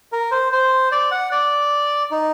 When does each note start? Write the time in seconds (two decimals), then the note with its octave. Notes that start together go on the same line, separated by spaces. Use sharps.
0.12 A#4
0.31 C5
0.52 C5
0.92 D5
1.11 F#5
1.31 D5
2.11 D#4